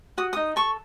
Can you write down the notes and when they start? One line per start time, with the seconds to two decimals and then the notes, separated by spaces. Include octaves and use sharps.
0.17 F#4 D#6
0.33 D#4 D#6
0.56 A4 C#6